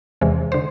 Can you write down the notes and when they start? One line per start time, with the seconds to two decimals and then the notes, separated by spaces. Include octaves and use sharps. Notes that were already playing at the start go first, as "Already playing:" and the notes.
0.21 E2 C3 E3 G#3
0.52 D3 C5